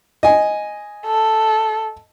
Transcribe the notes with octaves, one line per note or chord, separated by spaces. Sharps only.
D#5 G#5
A4